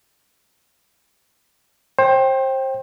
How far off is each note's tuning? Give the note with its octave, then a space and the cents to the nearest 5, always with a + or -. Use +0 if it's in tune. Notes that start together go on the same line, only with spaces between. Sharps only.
C5 +30 G5 +0